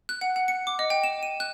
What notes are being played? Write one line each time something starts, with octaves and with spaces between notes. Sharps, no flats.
F#6
F#5
F#5
C#7
D6
D#5
G5
E7
D#7
F#6